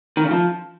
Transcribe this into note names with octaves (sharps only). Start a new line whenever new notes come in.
D#3
C#3
F3